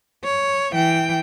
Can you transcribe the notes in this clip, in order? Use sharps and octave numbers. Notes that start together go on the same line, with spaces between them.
C#5
E3 G5